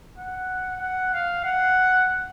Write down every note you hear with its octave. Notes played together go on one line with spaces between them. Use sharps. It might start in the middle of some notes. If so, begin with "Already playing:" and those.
F#5
F#5
F5
F#5